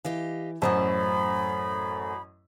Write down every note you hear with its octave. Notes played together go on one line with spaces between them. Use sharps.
E3 G4 D#5 F5
A1 F#2 A3 A4 C5 B5